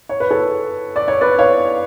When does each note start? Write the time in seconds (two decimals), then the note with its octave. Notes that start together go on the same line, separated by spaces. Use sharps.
0.09 C#5
0.20 B4
0.30 A4 C#5
0.96 D5
1.08 C#5
1.21 B4 D5
1.38 C#5 F5